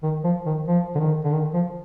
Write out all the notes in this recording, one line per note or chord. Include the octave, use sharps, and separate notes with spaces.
D#3
F3
D#3
F3
D3
D#3
D3
D#3
F3